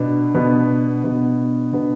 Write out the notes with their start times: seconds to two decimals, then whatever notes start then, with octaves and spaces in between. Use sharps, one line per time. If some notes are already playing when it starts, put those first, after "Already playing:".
Already playing: B2 B3 D4 B4
0.34 B2 B3 D4 B4
1.04 B2 B3 D4 B4
1.73 B2 B3 D4 B4